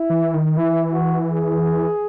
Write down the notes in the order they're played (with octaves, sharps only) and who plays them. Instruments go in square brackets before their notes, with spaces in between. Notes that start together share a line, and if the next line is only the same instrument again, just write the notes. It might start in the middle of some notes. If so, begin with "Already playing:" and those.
Already playing: [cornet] E4
[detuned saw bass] E3
D#3
[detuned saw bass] E3 [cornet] E4
[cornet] F#4
G#4